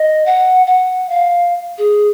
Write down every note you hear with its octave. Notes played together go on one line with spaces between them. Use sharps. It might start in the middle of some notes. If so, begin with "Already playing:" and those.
Already playing: D#5
F#5
F#5
F5
G#4